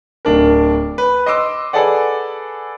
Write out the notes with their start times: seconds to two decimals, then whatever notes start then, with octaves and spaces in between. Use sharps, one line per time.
0.25 D1 D4 A#4
0.98 B4
1.26 D#5 C6 D6 E6
1.73 G#4 A4 B4 D5 F#5